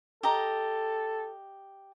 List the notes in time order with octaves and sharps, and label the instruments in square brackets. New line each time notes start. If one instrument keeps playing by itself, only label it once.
[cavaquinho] G4 D#5 A#5 [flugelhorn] A4